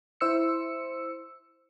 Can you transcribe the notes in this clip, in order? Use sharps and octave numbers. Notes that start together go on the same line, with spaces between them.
E4 C5 E6 C#7